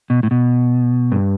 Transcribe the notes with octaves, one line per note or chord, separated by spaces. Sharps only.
B2
A2
B2
G2